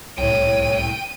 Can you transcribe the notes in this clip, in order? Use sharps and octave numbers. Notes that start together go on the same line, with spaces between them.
C2 A2 C#5 G5 D#7